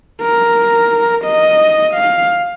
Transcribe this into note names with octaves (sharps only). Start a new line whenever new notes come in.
A#4
D#5
F5